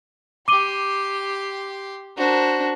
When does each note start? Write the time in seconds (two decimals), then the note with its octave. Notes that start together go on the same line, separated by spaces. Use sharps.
0.48 G4 C6 D6 D#7 G7
2.17 D4 F#4 A#4 C5